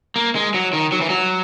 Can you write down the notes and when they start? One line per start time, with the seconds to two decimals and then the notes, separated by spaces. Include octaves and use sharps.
0.16 A#3
0.35 G#3
0.54 F#3
0.73 D#3
0.92 F#3
1.01 E3
1.10 F#3